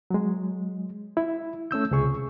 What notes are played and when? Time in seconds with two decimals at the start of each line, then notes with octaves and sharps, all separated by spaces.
0.11 F#3 G#3
1.17 E4
1.71 A3 C#4 E6 G6
1.91 C#2 C3 G#4 C#6